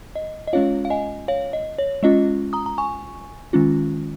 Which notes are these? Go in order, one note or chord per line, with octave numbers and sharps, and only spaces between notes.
D#5
D#5
G#3 C#4 F4 C#5 F5
F5
D#5 G#5
C#5 F5
D#5
C#5
G#3 C#4 F4 D#5
A#5 D#6
A#5
G#5 C#6
D#3 G#3 C#4 F4